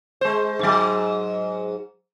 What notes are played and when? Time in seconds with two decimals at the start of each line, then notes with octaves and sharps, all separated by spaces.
0.21 G#3 C5
0.59 G#2 F#3